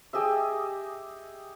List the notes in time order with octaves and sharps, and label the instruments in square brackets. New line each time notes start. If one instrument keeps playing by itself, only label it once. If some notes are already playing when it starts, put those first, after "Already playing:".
[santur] G4 G#4 D#5 E5